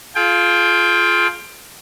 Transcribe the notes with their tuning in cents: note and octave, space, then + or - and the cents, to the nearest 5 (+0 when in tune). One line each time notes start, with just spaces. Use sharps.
F4 +0 G#4 +45 G5 +15